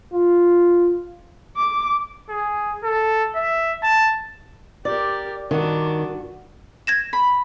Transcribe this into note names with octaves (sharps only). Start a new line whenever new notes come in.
F4
D6
G#4
A4
E5
A5
G4 A#4 D5
G2 D#3 D4 F#4
G#6 A#6 E7
B5